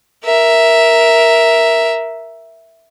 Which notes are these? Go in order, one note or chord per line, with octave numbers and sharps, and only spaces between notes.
A#4 E5